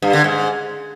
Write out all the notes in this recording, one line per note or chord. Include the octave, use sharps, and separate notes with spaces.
G2
D3
G#2